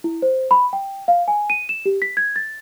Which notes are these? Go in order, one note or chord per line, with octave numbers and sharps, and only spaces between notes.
E4
C5
B5
G5
F5
G#5
D#7
E7
G4
B6
G#6
A6